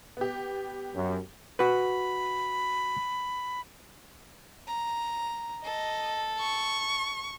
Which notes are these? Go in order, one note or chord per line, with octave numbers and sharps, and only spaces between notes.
B3 G4
F#2
F#4 B4 B5
A#5
A4 D#5
C#6